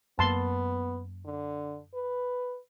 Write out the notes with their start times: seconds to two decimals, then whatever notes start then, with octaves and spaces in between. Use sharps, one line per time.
0.19 F#2 A#3 B3 A5 C6
1.25 D3
1.94 B4